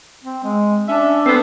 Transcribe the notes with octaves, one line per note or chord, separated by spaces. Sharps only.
C4
G#3
C#4 D4 E5
B3 C4 A4 B4